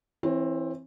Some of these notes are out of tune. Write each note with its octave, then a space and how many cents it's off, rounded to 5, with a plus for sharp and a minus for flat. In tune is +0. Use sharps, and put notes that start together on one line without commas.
E3 +0 C4 +15 C#5 -20